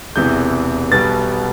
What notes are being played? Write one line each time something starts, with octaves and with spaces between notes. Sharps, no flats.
E1 E2 C3 E3 G6
B1 B2 G3 B3 A6